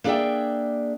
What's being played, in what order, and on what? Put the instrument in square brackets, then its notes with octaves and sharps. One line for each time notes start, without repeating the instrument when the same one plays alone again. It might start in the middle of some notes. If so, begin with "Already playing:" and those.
[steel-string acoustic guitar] A#3 D4 G#4 D5 E5 G5